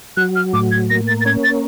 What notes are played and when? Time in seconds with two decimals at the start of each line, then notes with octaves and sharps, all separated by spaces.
0.17 F#3 F#6
0.36 F6
0.53 A2 D6
0.71 G#6
0.90 A#3 A#6
1.08 A6
1.21 A6
1.26 C#4 G#6
1.44 A6